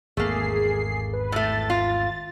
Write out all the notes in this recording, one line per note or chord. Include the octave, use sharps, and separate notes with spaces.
G#1 E2 A3 A#3 G#4 C7
B4
A2 A3 A6
F4